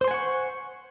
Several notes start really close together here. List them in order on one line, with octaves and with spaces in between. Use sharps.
C5 C6 G#5 F#5 C#6